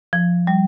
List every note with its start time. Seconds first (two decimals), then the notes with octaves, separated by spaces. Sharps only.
0.13 F3
0.47 G3